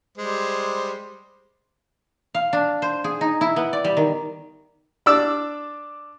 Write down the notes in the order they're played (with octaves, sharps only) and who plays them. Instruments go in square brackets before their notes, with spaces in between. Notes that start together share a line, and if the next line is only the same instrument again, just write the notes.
[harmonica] G3 G#3 C5
[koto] F5
D4
C5
G#4
D#4
E4
B3
D5
G3
D#3
[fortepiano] D4 D5 D6 E6